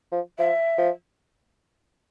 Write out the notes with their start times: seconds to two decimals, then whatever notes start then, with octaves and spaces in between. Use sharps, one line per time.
0.12 F3
0.38 F3 E5
0.78 F3